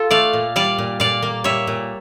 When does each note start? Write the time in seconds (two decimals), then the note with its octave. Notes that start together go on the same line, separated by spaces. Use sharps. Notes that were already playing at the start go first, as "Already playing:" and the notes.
Already playing: F4 A4
0.11 A3 D5 F5
0.33 A#2
0.56 G3 D5 F5
0.78 A#2
1.00 A#2 D5 F5
1.23 A#3
1.44 G3 C#5 E5
1.67 A#2